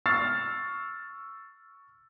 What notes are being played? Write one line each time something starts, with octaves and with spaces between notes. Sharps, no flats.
C#6 E6 F6 A6 C7